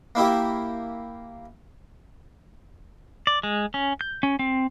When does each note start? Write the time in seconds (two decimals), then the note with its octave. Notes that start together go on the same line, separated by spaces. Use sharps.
0.15 A#3 E4 G4 E5
3.27 D5
3.43 G#3
3.74 C#4
4.01 G6
4.23 C#4
4.39 C4